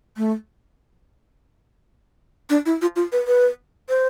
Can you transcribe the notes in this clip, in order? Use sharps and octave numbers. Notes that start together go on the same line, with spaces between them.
A3
D4
E4
F4
F4
B4
B4
C5